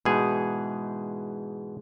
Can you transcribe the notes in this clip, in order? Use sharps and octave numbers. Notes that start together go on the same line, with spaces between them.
G#2 B2 E3 D#4 G#4